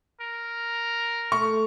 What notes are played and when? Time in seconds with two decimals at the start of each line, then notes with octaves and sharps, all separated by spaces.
0.21 A#4
1.32 A3 C#6